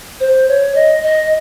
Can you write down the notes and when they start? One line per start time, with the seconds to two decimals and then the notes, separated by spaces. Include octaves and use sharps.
0.20 C5
0.48 C#5
0.75 D#5
1.03 D#5